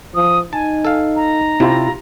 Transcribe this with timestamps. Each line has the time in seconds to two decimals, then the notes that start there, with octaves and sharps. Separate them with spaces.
0.15 F3 D#6
0.53 D#4 G#5 A5
0.85 A4 F5
1.16 A#5
1.60 C3 E4 F4 G4